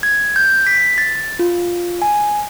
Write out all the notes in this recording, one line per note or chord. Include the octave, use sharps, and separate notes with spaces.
G#6
G6
B6
A6
F4
G#5